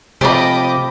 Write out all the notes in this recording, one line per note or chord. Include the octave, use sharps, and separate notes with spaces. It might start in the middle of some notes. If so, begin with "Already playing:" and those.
C3 F3 A3 G4 D#5 B5 D6